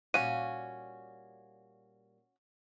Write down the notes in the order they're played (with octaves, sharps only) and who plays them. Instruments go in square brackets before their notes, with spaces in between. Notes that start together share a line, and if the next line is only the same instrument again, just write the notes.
[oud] A#2 G3 F5 [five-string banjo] C#4 F#4 [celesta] D#7